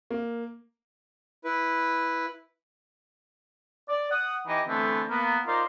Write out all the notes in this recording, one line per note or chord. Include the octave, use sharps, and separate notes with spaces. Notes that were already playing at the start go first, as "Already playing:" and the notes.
A#3
E4 B4
D5
F#5 D#6
E3 D#4 G4 D#5
D3 E3 A3 B3 C4
A#3 B3
D#4 F4 A#4 C5 D5